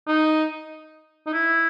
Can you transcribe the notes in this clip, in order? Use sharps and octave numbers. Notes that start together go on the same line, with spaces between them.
D#4
D#4
E4